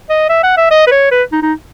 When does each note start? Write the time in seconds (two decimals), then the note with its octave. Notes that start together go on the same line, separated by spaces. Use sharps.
0.10 D#5
0.29 E5
0.43 F#5
0.57 E5
0.71 D#5
0.87 B4
0.91 C#5
1.11 B4
1.32 D#4
1.42 D#4